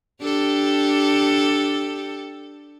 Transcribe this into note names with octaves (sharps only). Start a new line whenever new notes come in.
D4 G4 A4